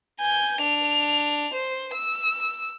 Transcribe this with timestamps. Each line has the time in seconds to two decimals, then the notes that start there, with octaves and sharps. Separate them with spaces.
0.20 G#5 G6
0.62 D4 F7
1.53 C5
1.94 E6